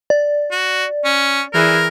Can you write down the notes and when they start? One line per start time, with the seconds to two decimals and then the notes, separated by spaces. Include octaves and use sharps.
0.10 D5
0.51 F#4
1.05 C#4
1.54 E3 G#4 A#4